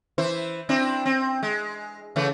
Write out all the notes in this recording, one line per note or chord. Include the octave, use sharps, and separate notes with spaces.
E3 E4 C5
C4 D4 E4
C4
G#3
C#3 E3 A3